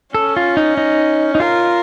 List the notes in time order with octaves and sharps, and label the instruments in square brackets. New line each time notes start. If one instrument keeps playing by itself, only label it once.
[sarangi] C#4 [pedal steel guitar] A4
[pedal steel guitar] F4
D#4
D#4
D#4
[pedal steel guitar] F4 [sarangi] A#4